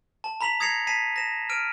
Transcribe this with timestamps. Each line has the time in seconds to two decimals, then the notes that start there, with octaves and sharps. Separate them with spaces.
0.24 A5
0.41 A#5 B5 B6 F7 F#7
0.60 D#6 G#6 A#6 C7 C#7 F7
0.87 A5 B6 C7 D#7
1.16 A#6 E7
1.49 F6 D7 D#7